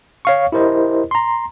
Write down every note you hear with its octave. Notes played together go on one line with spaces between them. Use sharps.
C#5 F5 C#6
E4 G4 A#4 C5 D#5
A#5 C6